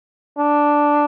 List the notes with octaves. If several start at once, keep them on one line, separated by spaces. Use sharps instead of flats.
D4